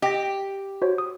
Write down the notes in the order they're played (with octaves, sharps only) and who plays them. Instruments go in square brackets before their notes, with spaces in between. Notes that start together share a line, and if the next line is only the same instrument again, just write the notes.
[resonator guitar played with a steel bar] G4 [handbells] D#5 G5 A#6
[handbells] F#4 C5 C#5
D#6